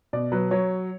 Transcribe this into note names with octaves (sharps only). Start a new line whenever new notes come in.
B2 D5
F#3 B4
F#3 C#5